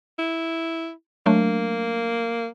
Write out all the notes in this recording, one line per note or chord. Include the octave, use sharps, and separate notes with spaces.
E4
F#3 A3 A#3 D4